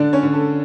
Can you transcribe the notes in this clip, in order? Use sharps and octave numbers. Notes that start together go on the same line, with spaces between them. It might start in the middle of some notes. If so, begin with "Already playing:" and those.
Already playing: D3 D4 D5
C#4 C#5
D3
A4